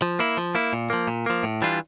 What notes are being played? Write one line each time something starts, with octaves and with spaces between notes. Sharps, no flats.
F3
A#3 E4
F3
A#3 E4
A#2
F3 A#3
A#2
F3 A#3
A2
E3 G3 D4 F4